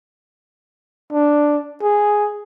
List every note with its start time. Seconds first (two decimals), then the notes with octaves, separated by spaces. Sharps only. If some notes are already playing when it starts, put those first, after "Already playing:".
1.12 D4
1.82 G#4